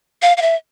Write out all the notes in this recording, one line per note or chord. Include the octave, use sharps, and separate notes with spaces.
F5
F5
E5